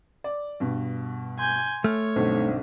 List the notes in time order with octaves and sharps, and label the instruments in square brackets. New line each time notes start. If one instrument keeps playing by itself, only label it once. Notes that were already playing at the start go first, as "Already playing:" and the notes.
[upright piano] D5
G2 B2
[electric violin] G#5 G6 [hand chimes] C6
[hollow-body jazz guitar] A3 [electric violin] C#5 [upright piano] F6
[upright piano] B1 G2 D3 [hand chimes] C4 D#4 C5